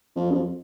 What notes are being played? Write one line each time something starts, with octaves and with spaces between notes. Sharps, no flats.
F2
F#2
F2